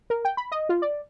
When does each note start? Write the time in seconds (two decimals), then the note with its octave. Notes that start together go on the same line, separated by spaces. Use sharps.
0.10 A#4
0.25 G5
0.37 B5
0.52 D#5
0.69 F4
0.82 D5